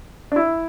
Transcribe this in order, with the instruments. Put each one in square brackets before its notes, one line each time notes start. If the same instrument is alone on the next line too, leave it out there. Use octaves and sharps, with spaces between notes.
[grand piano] D4
E4